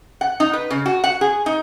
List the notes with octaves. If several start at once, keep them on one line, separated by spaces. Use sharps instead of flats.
F#5
D#4
B4
C#3
F#4
F#5
G#4
D#4